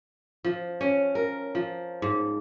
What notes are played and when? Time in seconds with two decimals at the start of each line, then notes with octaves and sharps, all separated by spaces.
0.44 F3
0.81 C#4
1.15 A#4
1.55 F3
2.02 G#2